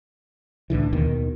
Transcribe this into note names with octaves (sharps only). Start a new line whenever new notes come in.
C#2 A2 D3 E3
D#2 B2 D#3